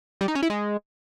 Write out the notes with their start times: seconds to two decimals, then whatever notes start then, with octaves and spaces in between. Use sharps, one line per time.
0.21 G3
0.28 D#4
0.35 C#4
0.43 E4
0.50 G#3